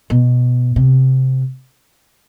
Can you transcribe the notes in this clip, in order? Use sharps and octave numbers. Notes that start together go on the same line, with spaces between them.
B2
C3